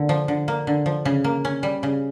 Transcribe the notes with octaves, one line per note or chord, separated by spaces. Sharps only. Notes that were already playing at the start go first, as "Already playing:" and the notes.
Already playing: D3 A#3
F3
D3
A#3
D3
F3
C#3
A#3
C#4
G3
C#3